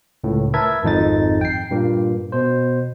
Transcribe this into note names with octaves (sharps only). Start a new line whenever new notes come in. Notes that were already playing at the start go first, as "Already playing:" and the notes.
C#2 A2
A#4 B4 E5 A5 G#6
G#1 F2 D#4 A6
G5 C7
G2 A#2 A#3
B2 C5